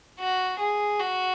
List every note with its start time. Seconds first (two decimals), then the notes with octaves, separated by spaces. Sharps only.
0.19 F#4
0.59 G#4
1.00 F#4